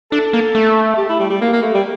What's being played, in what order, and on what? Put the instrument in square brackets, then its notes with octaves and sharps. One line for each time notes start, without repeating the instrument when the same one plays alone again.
[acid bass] D4 [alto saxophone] A4
[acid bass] A#3
A3
[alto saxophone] G4
E4
G3
G3
A#3
A#3
A3
G3